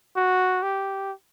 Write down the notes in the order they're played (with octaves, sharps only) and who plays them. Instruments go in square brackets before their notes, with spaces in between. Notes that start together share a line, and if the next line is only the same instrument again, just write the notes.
[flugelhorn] F#4
G4